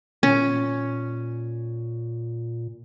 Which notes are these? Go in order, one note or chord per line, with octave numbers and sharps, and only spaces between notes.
A#2 C#4